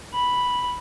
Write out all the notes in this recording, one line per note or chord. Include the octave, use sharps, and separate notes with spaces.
B5